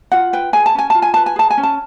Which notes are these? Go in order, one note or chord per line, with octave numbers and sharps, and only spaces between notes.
F4 F#5
B4 G5
G#4 G#5
A5
C#4 G#5
F4 A5
G#5
B4 A5
G#5
G#4 A5
G#5
C#4
A5